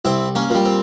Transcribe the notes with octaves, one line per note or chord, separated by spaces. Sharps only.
C2 C4 E4
A#3 C#4
A#2 G3
C4